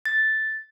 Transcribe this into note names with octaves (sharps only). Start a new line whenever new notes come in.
A6